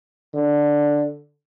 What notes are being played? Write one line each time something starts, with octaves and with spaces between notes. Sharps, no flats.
D3